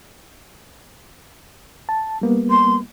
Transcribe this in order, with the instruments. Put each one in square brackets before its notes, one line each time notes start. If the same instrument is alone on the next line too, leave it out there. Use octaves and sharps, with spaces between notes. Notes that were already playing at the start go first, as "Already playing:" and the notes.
[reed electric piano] A5
G3 A#3 B3
[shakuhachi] C6